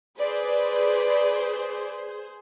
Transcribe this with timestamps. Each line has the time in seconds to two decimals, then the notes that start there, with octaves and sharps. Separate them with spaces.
0.18 G#4 B4 C5 D5